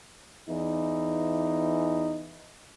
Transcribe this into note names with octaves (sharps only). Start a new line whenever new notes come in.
E2 E3 D#4